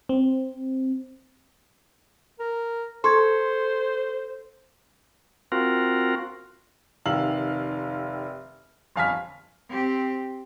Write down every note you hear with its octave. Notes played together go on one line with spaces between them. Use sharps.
C4
A#4
A4 C5 C6 C#6 G#6
C4 F4 F#4 A#4
F1 C3 D#3 F5 E6 F#7
G1 F2 F5 G#5 F6 B6
C4 G4